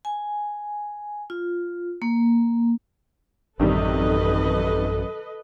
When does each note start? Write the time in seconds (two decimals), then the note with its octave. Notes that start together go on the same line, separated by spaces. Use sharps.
0.05 G#5
1.30 F4
2.02 A#3
3.60 A1 F#2 C3 D#3 G3 A4 B4 D#5